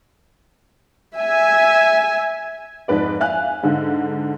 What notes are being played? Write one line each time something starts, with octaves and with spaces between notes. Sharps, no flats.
E5 G#5
F2 G#2 B4 D5
E5 F5 G#5 F#6
G#2 D3